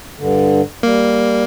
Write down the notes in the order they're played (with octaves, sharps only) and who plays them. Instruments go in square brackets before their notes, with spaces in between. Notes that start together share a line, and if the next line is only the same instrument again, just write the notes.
[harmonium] G2 D3
[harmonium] G3 [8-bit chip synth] A#3